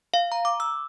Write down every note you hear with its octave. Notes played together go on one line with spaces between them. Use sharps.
F5
A#5
D6
E6